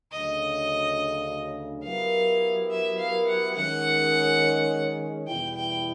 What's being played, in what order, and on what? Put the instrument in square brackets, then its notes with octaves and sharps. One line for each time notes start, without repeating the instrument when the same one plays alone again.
[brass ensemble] D2 C#3 F#3 [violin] D#5
[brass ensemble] F#3 B3 E4 G4 A#4 [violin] F5
[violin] E5
F5
F#5
[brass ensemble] D#3 G#3 C#4 [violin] F#5
[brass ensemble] E2 B2 G3 B3 E4 [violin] G5
[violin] G5